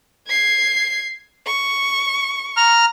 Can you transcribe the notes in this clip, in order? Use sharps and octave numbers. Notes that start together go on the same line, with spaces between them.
G#6 C7
C#6
A#5 F6